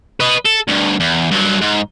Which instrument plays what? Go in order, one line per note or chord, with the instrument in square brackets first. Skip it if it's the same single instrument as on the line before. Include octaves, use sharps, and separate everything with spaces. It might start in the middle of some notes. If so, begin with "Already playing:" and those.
[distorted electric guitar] B4 D#5
A4
D2 G2
E2
G2 F#3
G#2